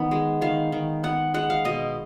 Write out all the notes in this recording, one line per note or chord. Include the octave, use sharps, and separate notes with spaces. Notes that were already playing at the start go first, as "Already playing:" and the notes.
Already playing: D#3 B3
G#3
D#3 F5
D#3
B3 F#5
G#3 F#5
F5
B2 D#5